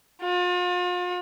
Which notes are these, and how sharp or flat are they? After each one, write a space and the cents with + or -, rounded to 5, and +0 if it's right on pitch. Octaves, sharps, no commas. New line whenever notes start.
F4 +40